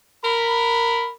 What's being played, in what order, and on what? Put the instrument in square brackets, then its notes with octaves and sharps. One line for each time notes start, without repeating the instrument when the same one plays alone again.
[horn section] A#4 B5